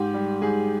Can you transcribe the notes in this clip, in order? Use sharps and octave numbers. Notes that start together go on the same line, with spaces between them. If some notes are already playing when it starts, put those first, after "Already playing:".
Already playing: G#2 G4
G3
G#2 G#4